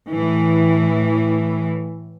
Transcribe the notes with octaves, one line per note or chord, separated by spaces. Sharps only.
A2 E3